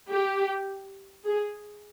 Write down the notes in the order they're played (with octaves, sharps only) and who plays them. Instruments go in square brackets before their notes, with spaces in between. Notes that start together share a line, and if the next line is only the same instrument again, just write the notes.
[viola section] G4
G#4